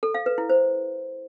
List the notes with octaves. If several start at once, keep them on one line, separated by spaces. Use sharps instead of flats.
A4
F5
B4
E4
C5